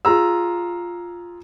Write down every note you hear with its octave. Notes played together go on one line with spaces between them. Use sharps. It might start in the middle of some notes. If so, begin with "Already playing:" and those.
F4 G#4 A#5 E6